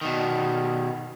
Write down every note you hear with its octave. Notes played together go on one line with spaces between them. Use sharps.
B2 D#3